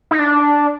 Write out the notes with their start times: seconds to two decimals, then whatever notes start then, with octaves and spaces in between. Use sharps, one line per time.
0.11 D#4
0.19 D4